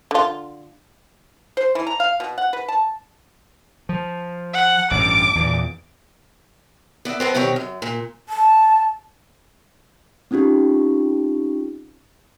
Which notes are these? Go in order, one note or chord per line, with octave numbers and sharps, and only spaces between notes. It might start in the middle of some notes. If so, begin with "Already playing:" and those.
D3 F4
C5
E3
A#5
F5
B2
F#5
B4
A5
F3
F#5
A1 G2 D6
E2 A#2
B3 D5 E5
F2 B3 C4
B2 D#3 G3 C4 C#5
F#2
A#2
A5
C4 C#4 D#4 F4 G4